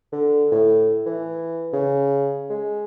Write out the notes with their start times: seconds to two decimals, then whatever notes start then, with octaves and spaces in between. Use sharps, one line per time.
0.13 D3
0.52 A2
1.06 E3
1.73 C#3
2.50 G#3